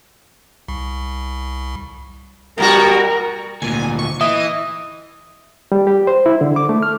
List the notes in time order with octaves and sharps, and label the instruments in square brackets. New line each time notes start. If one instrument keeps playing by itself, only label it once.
[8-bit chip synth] C2
[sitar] B2 G3 F#4 [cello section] A#4
[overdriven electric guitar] D2 A#2 [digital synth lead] G#5
[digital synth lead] C#6
[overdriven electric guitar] E3 [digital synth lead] D#5 [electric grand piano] E5 [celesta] D#6
[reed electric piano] G3
G4
C5
E4
D3
D6
A3
F6